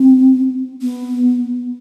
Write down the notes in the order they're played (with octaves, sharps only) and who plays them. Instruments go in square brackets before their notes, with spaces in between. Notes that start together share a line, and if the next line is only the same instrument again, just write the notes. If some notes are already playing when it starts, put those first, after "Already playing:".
Already playing: [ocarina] C4
B3